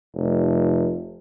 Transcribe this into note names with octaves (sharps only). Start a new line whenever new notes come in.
F1